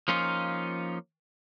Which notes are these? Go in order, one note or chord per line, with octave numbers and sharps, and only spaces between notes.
F3 A#3 C#4 D#4 F4